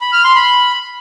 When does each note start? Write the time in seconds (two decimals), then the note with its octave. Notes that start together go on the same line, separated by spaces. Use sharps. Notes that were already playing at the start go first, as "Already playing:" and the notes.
0.01 B5
0.13 F6
0.24 C6
0.35 B5